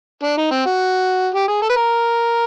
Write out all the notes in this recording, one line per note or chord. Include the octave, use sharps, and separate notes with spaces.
D4
D#4
C4
F#4
G4
G#4
A4
B4
A#4